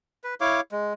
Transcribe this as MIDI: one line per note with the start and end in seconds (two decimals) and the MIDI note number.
0.24 0.35 71
0.41 0.61 64
0.41 0.61 73
0.41 0.61 77
0.41 0.61 86
0.72 0.93 56